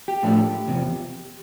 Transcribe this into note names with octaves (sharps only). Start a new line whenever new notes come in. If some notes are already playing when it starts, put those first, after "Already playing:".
G4
A2 F3 A3 D4
E2 C3 F3